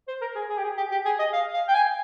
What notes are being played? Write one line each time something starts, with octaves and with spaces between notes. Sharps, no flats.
C5
A#4
G#4
G#4
G4
G#4
G4
G4
G#4
D#5
F5
F5
G5
G#5